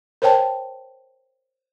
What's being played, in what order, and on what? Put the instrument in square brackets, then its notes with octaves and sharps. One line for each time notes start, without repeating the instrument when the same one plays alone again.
[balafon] A#4 C5 C#5 G5 A5